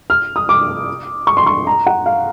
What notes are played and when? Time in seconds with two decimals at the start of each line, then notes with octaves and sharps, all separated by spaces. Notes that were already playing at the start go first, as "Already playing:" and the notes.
0.10 F6
0.36 D#6
0.49 D6
1.27 C#6
1.37 C6
1.46 C#6
1.67 A#5
1.87 F#5
2.06 F5